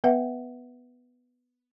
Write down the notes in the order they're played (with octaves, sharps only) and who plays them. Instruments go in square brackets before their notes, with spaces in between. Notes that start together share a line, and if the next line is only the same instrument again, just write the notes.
[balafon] B3 B4 E5 F#5